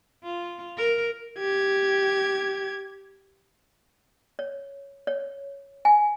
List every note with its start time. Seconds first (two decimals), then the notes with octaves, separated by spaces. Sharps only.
0.24 F4
0.77 A#4
1.38 G4 G#6
4.39 C#5
5.07 C#5
5.85 G#5